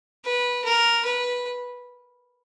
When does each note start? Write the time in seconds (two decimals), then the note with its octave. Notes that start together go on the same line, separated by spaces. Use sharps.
0.25 B4
0.64 A#4
1.05 B4